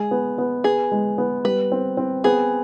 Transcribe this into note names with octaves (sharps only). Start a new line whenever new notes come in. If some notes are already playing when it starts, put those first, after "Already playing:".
Already playing: G#3 G#4
B3
B3
B3 G#4
G#3
B3
G3 B4
C4
C4
B3 G#4